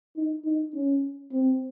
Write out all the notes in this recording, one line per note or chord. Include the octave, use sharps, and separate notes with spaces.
D#4
D#4
C#4
C4